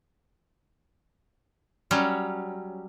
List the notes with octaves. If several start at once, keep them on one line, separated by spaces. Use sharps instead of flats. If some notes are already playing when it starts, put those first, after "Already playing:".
F#3 G3 C#4